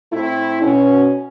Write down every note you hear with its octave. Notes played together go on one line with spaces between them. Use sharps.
A2 A3 C4 E4
B2 C#4